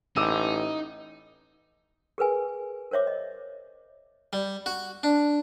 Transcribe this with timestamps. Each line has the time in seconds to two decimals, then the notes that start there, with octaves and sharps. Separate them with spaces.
0.16 A1 D#4 D6 E6 D#7
2.18 G#4 A#4 B4 G#5
2.91 A#4 C5 C#5 E5 D6
3.07 D#5
4.33 G3
4.66 F#4
5.03 D4